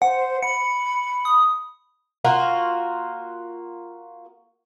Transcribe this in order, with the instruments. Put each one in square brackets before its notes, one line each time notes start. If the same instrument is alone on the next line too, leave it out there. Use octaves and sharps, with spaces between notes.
[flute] C5 [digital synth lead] F#5
[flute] B5 [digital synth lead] C#7
[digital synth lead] D#6
[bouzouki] A#3 F4 F#4 A#4